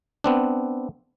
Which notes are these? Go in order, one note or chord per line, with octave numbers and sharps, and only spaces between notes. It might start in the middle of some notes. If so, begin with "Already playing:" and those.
B3 C4 D4